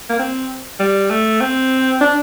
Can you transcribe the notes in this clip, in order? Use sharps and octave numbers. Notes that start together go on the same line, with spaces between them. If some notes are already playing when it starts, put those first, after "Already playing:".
A#3
C4
G3
A3
C4
D4